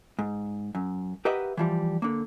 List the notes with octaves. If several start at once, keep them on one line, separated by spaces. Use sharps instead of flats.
G#2
F#2
G4 A#4 B4 D#5 E5 F#5
E3 F3 G3
D3 A#3